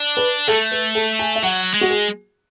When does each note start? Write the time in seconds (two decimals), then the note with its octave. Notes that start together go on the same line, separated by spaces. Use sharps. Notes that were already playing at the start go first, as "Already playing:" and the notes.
Already playing: D4
0.17 B4
0.48 A3 A4
0.72 B4
0.95 A4
1.19 G#5
1.36 E5
1.43 F#3 F#5
1.74 G#3
1.81 F#4
1.90 G#4